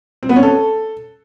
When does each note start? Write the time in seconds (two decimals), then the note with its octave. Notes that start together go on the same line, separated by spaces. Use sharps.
0.23 C4
0.29 B3
0.36 C#4
0.43 A4